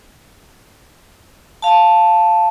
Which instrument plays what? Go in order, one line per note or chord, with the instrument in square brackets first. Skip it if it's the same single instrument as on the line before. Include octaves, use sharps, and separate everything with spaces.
[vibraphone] F5 A5